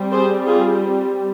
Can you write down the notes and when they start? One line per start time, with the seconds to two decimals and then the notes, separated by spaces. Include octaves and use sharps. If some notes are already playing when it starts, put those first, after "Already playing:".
Already playing: G3 C4
0.11 G#4 C5
0.46 F4 G#4